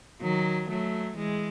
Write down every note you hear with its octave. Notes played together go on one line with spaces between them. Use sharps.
D#3 F#3
F#3 A3
E3 G#3